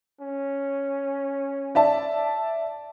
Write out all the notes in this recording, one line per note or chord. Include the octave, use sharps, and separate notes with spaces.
C#4
D5 E5 A5